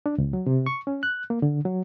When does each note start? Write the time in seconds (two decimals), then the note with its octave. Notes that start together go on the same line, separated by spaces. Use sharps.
0.06 D4
0.18 C#2
0.33 F#3
0.47 C3
0.66 C#6
0.87 C#4
1.03 F#6
1.30 A#3
1.42 D3
1.65 F#3